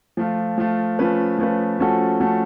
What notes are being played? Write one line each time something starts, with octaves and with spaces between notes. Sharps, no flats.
F3 A3 F4
F3 A3 F4
F3 A3 C#4 F4 B4
F3 A3 C#4 F4 B4
F3 A3 C#4 F#4 A4
F3 A3 C#4 F#4 A4